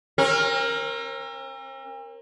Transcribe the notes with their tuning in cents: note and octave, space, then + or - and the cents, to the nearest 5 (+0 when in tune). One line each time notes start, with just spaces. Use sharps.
C4 +45 A#4 +0